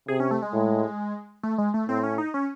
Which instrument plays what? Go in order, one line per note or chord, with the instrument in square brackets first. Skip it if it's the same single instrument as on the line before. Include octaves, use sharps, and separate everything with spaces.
[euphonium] C3 [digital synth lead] G#4
[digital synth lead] C#4
A3
G#3
[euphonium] A2
[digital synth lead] A3
G#3
A3
[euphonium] A2 [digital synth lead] C4
[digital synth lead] C#4
D#4
C#4